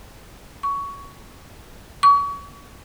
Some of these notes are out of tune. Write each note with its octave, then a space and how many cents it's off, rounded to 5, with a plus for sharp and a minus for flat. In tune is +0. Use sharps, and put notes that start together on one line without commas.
C#6 +15
C#6 +35